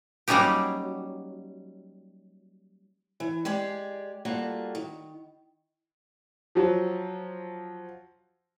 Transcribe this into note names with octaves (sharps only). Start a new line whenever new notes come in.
F#3 G3 A#3 C#4 D#4 G4
E3
G#3 G4 G#4 D5
G3 A#3 F4 F#4 A4
D#3
F3 F#3